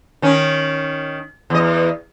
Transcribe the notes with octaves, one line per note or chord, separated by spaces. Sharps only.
D#3 C#4
E2 D#5